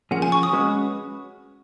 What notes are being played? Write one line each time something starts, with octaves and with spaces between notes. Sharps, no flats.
F3 A#3 C#4 G#4 F#5
G#5
C#6
D#6
G#3 C#4 F#4 B4